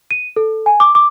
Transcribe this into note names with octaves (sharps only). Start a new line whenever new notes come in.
D#7
A4
G#5
D6
D6